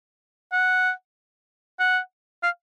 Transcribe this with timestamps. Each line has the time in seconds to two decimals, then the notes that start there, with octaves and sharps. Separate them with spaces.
0.52 F#5
1.79 F#5
2.43 F5